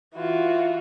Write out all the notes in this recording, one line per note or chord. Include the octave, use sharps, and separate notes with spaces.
E3 F4 F#4